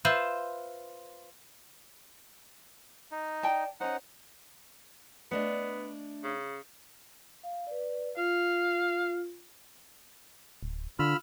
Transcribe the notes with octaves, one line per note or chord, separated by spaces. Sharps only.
F4 B4 C5 E5
D#4
D5 G5 A5
C#4 D#4 C5 F#5
A3 B3 D4 D#5
C#3
F5
B4 D5
F4 F5
D1
D3 F4 B5 E6 F6